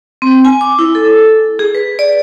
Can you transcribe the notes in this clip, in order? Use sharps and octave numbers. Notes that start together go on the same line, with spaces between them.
C4
G#5
D6
E4
A4
G#4
B4
D5